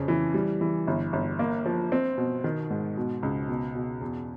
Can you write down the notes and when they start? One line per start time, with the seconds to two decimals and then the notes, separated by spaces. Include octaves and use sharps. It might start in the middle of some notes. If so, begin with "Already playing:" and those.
Already playing: F2 C#3
0.08 E3
0.34 G3
0.61 E3
0.87 G1
1.13 G1
1.39 A#3
1.66 F3
1.92 C4
2.17 B2
2.44 D#3
2.70 G#2
2.97 B2
3.23 C#2
3.48 B2
3.75 B2
4.01 E2